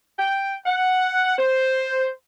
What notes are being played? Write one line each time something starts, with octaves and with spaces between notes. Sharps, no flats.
G5
F#5
C5